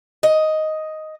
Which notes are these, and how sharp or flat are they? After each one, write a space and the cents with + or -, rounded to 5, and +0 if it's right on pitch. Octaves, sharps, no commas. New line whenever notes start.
D#5 +5